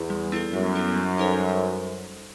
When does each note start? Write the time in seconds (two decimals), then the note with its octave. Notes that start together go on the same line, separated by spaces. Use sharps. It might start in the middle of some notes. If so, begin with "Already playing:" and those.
Already playing: E2
0.10 G3
0.32 B3 E4 A4
0.53 F#2 G3
0.75 B3 E4 A4
0.96 G3
1.18 D#4 A4 C5
1.40 G3